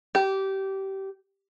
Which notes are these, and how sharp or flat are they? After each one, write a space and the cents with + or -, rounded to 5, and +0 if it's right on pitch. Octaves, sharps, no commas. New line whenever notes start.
G4 -20